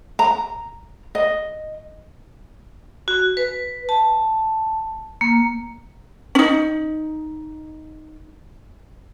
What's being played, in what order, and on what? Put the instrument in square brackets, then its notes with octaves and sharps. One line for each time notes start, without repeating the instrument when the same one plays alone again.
[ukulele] A#5
D#5
[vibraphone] F#4
B4
A5
A#3
[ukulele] C#4 D#4